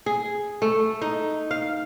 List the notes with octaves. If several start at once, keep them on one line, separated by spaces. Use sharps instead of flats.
G#4
A3
D#4
F5